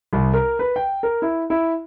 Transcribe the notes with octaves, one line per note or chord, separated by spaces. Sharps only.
C2
A#4
B4
G5
A#4
E4
E4